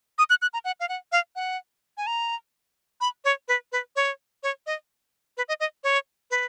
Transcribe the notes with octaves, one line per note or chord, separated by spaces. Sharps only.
D#6
F#6
F#6
A#5
F#5
F5
F#5
F5
F#5
G#5
A#5
B5
C#5
B4
B4
C#5
C#5
D#5
B4
D#5
D#5
C#5
B4